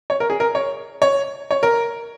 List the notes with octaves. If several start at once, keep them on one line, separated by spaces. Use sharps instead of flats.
C#5
A#4
G#4
A#4
C#5
C#5
C#5
A#4